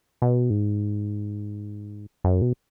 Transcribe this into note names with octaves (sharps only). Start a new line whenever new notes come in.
B2
G#2
F#2
B2